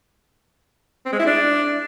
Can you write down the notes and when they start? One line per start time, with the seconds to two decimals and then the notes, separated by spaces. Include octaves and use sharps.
1.06 C4
1.13 G#3
1.20 E4
1.27 D4